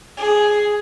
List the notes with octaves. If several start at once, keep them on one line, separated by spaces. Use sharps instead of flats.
G#4